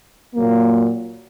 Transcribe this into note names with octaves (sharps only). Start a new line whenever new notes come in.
A#2 F#3 A#3